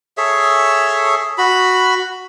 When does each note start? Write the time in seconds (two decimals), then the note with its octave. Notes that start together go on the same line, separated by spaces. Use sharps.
0.17 G#4 A4 C#5 E5
1.38 F#4 B5